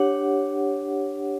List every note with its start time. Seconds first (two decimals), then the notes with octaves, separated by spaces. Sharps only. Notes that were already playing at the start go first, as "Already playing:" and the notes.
Already playing: D4 G4 C#5 F#5